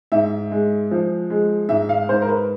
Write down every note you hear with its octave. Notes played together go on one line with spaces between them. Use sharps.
G#2 E5
G#3
F3
G#3
G#2 E5
F5
G#2 C5
A#4
B4